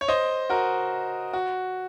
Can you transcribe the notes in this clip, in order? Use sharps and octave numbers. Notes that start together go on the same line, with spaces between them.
C#5
C5 D#5
F#4 A#4
F#4